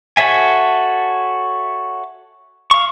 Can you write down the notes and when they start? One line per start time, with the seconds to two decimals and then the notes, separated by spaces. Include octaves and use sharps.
0.17 F#4 A4 C#5 E5 G#5
2.71 F5 C#6